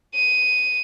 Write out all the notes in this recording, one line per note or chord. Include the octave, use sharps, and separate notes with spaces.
D#7